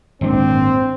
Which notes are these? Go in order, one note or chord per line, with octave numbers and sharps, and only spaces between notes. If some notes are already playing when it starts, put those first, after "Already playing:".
G#1 A#2 C4 D4